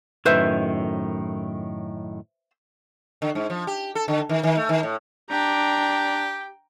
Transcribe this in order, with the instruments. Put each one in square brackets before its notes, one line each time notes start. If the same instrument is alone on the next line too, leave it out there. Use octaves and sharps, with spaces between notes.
[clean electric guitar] F#2 A2 D#3 [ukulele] B4 C5 E5
[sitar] D3
G#2
F3
G4
A4
D3
D#3
D#3
A3
D#3
A2
[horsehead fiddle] D4 [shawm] G4 [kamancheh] G5 [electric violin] A#5